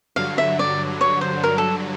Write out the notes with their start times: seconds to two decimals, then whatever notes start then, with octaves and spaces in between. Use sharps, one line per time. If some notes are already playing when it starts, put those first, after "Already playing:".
0.16 G2 D3 F#3 F5
0.38 E5
0.59 D5
1.01 C#5
1.21 C5
1.43 A#4
1.58 A4